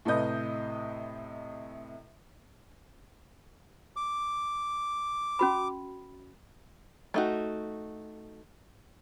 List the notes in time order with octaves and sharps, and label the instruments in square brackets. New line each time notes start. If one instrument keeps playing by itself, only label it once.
[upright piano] A2 C3 A4 B4 D#5 G6
[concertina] D6
[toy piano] C#4 F#4 B5
[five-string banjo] A3 D#4 F#4